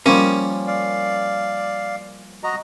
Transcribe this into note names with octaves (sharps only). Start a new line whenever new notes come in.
F3 G3 A#3 C#4
D5 F5
F#4 D#5 A#5